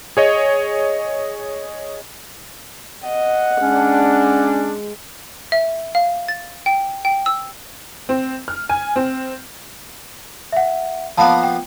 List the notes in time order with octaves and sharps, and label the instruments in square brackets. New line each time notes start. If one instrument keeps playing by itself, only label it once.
[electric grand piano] G#4 C#5 D#5
[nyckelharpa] D#5 [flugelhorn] F#5
[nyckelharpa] G#3 [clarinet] C#4 [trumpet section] D4
[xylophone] E5
F5
A6
G5
G5
E6
[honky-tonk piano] C4
F6
G#5
C4
[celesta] E5 F#5
[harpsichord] F3 A#3 B3 [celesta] A5 B5
[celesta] G5